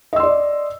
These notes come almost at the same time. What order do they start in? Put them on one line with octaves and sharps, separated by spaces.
D#5 E6 C6 D5